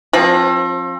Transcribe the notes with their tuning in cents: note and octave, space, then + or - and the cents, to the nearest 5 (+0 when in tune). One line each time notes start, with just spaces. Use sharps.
F3 +15 C4 +40